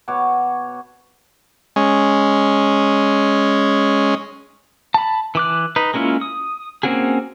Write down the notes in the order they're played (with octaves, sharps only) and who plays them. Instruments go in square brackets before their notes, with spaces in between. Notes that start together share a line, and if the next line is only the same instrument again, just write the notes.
[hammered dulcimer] B2 F#4 C#5 D6
[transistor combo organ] G#3 C#4
[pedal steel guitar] A5 B5
E3 D6 F#6
D#4 B4
G#3 A#3 C#4 E4 F4
D#6
A#3 C4 C#4 F#4 G#4